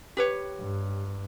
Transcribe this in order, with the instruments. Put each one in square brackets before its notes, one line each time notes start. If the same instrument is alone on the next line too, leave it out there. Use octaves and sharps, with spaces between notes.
[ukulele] G4 B4 C#5
[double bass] G2